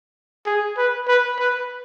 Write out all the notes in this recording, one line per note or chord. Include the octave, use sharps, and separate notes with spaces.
G#4
B4
B4
B4